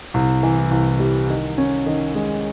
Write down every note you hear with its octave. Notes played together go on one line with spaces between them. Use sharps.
C2
E3
C2
G3
D#3
C#4
D#3
G#3